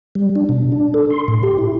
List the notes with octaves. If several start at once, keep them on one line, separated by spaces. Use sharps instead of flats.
G3
D4
B2
D4
A4
C6
A2
G4
E4